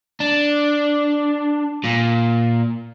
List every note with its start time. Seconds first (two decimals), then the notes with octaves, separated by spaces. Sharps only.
0.20 D4
1.84 A#2